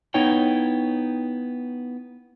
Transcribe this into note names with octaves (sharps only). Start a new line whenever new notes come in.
B3 D#4 E4 C#5 G5